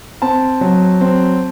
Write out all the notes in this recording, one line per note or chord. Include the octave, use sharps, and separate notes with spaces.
C4 A5
F#3
C4